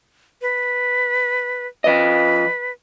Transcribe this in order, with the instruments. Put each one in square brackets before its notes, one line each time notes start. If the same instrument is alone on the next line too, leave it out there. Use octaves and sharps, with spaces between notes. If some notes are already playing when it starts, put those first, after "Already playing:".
[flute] B4
[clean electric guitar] F3 D#5 [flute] B4